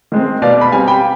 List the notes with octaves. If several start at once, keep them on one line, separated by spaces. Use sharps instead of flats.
D#3 G#3 C4
B2 D5 F5
B5
G3 C4 F5 G#5
G5 B5